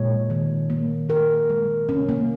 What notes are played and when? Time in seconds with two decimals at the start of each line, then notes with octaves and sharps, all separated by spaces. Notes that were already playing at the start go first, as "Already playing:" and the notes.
Already playing: A#2 G#3 C#5
0.30 D#3
0.70 A#3
1.09 D#3 A#4
1.50 G#3
1.89 C3 C#4
2.09 A#3